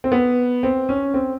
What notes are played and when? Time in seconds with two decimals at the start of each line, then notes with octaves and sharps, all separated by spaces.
0.04 C4
0.12 B3
0.63 C4
0.89 C#4
1.14 C4